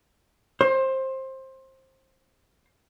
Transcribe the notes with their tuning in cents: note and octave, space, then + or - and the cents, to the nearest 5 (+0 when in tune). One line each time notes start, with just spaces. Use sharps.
C5 +20